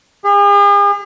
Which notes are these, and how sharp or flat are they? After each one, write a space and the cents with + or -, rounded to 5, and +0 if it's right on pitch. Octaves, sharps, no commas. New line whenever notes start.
G#4 -45